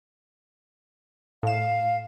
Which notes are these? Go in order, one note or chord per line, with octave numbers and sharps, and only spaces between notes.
A2 F5 E7